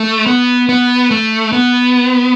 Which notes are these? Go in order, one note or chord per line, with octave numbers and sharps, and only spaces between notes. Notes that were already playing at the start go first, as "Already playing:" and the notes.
Already playing: A3
B3
B3
A3
B3